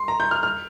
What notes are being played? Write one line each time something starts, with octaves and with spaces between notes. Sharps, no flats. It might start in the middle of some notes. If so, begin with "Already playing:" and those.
Already playing: C6
A#5
G6
F6
F6